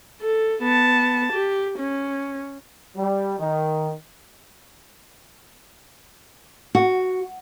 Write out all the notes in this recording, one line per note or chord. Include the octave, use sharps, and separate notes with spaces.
A4
B3 A5
G4
C#4
G3
D#3
F#4